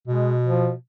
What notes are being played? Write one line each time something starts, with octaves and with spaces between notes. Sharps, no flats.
B2 G#3
F3